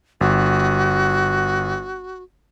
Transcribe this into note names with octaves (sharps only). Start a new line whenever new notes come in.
G1 F#4